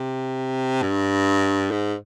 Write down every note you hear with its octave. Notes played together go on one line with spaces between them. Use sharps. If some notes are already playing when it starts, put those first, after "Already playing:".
Already playing: C3
G2
G#2